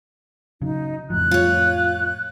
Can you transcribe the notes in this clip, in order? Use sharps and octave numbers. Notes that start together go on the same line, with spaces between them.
C#3 F#3 D#4
F2 A2 F3 F#6
F4 C#5